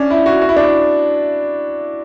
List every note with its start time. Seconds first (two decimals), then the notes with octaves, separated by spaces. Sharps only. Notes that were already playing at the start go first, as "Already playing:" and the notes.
Already playing: C#4 D4
0.10 E4
0.26 F#4
0.41 F#4
0.49 E4
0.56 D4
0.64 E4